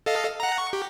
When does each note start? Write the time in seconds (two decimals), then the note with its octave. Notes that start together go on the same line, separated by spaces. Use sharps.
0.06 A4 D#5 F5
0.40 F#5 A#5
0.58 C#6
0.73 G4